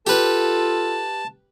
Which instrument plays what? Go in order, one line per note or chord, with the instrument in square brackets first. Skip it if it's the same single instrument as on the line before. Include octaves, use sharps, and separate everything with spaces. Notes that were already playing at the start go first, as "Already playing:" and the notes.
[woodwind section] F4 A4 [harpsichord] G4 B4 [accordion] A5